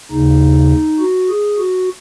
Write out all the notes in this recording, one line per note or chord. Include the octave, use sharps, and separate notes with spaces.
D#2 C#3 D#4
F#4
G#4
F#4